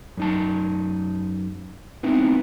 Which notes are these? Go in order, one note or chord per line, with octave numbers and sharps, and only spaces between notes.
F#2 D#4 A5
B3 C4 D#4 E4